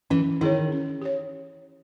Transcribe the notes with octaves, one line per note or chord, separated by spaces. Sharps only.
E3 C#4
D#3 E4 G#4 C#5
C#4
G4 C#5